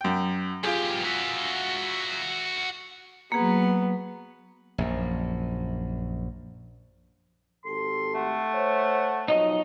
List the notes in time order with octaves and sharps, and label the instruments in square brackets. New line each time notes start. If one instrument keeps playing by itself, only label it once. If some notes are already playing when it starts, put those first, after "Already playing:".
[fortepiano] F#2 G5
[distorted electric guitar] B1 G4 [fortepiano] F4 G#4
[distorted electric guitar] F#4 E5
[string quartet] F#3 B3 [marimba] A#3 G#4
[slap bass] A#1 F#2
[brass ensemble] G#1 G4 A4 [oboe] C6
[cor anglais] A3 [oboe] F#5
[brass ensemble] C5 C#5
[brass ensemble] B1 F3 F#3 [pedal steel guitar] D#4 D#5